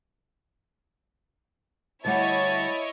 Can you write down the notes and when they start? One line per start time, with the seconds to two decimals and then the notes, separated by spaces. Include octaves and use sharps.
2.05 D2 G3 E4 C#5 D#5 F#5 A5